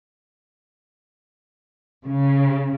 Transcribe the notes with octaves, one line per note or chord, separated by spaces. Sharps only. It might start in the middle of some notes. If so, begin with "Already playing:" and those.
C#3